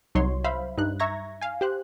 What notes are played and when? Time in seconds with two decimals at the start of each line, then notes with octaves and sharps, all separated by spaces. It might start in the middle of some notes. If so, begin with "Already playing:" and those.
0.15 C2 F#3 D#4 C#5 C6
0.44 C5 E5 F5 B5
0.78 G2 D#4 F#6
1.00 E5 A#5 C#6 G#6 A#6
1.41 F5 G#5
1.61 G4 C5 F#6